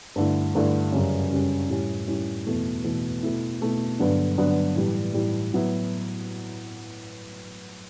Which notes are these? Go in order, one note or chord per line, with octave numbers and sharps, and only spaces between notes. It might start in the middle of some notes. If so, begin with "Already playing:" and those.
G2 D3 A3 E4
G2 D3 A3 E4
F#2 C#3 G3 C#4
F#2 C#3 G3 C#4
A2 G3 C#4 E4
A2 G3 C#4 E4
E2 B2 A3 E4
E2 B2 A3 E4
B2 A3 E4
B2 A3 E4
G2 D3 F#3 B3 D4
G2 D3 F#3 B3 D4
A2 E3 G3
A2 E3 G3
A2 F#3 B3 E4